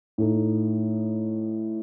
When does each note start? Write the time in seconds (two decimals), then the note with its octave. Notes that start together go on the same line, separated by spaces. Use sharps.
0.18 A2 A3 D#4